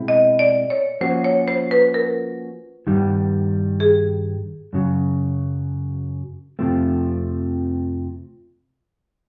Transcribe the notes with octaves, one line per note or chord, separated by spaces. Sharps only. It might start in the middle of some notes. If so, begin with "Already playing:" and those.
Already playing: B2 G#3 C4 E4
D#5
D5
C#5
F3 A#3 C#4 F#4 C5
C#5
C5
B4
A#4
G2 D#3 G3
G#4
F#2 C#3 F#3
F2 C3 F3 A3 C4